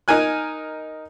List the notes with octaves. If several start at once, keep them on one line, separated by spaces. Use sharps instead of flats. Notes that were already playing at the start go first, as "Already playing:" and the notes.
D#4 A#4 G#5 F#6